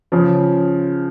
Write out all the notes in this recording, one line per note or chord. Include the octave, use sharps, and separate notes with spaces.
C#3 F3